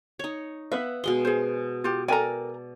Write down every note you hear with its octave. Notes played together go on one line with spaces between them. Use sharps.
D#4 C#5
B3 B4 E5 F5
B2 G#3 C6
G#4 C5
F4 G4
A4 A#4 D5 G5 G#5 A#5